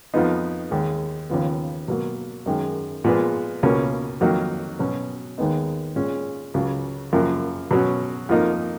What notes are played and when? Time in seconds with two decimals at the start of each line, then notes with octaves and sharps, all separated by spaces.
0.14 F2 F3 B3 D#4
0.71 D#2 D#3 G#3
1.30 D#2 C#3 F3 B3
1.88 B2 F#3 A#3
2.46 F#2 D#3 G#3
3.04 A#2 F3 G#3 B3
3.63 C#2 B2 A#3 C#4
4.21 F2 D#3 F#3 A#3 D#4
4.79 B2 F#3 C#4
5.38 D#2 D#3 G#3 B3 D#4
5.96 A#2 G#3 C#4
6.54 C#2 C#3 F#3
7.13 F#2 C#3 F3 A#3
7.71 B2 F#3 C#4
8.29 F2 F3 A#3 D#4